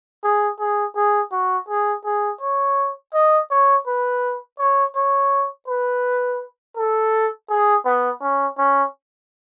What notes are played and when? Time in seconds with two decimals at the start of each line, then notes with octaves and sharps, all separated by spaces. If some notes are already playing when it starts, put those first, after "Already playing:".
0.24 G#4
0.60 G#4
0.96 G#4
1.32 F#4
1.69 G#4
2.05 G#4
2.41 C#5
3.14 D#5
3.51 C#5
3.87 B4
4.59 C#5
4.95 C#5
5.68 B4
6.77 A4
7.50 G#4
7.85 B3
8.21 C#4
8.58 C#4